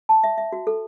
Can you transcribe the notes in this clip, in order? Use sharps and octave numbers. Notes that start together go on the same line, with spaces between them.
A5
E5
E5
F#4
A4